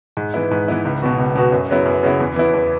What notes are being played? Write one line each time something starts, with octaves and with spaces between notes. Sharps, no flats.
G#2
E3 B3 E4
G#2
E3 B3 E4
C#2
B2 B3 F#4
C#2
B2 B3 F#4
F#2
C#3 F#3 B3 E4
F#2
C#3 F#3 B3 E4
E2
E3 B3 E4
E2